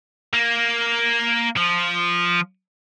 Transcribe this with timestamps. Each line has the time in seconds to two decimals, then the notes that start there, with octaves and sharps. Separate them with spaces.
0.34 A#3
1.57 F3